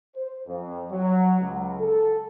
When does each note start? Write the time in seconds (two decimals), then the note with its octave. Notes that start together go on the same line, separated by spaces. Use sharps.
0.15 C5
0.47 F2
0.91 F#3
1.40 C#2
1.80 A4